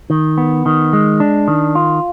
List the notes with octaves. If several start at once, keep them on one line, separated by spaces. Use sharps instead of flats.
D#3
B3
D#3
G#3
D4
D#3
F4